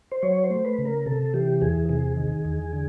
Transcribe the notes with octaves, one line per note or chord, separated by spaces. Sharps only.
C5
F#3 C#5
C5
A3
B4
C#3
A#4
C3 A4
E3 G4
E2 G#4
C3 G#4
D#3
E2
D3